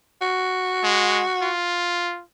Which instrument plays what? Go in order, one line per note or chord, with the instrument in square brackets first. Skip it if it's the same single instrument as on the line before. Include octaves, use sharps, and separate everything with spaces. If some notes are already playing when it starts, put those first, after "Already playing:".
[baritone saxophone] F#4
[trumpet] G#3
F4